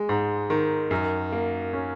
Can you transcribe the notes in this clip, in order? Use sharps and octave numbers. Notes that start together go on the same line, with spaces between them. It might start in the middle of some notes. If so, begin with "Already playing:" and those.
Already playing: G#3
G#2
D#3
F#2
A#3
C#4